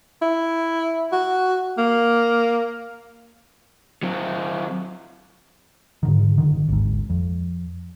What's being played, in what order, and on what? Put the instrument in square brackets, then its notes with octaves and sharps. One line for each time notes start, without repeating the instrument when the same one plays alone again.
[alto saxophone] E4
F#4
A#3
[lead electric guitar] F#3 C4
[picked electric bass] G#2 D3 D#3
F#1 D3 D#3
G#1 D2 G#2
F2